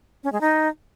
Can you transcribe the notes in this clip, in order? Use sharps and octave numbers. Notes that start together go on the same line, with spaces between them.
C#4
G#3
D#4